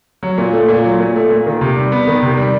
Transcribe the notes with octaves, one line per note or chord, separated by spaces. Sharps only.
F#3
A#2
A3
A#2
F#3
A#2
A3
A#2
D#3
C3
G3
B3
D#3
C3
G3